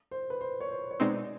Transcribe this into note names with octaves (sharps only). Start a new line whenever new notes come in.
C5
B4
C5
C#5
C5
C#5
B2 G#3 C4 D#4 D5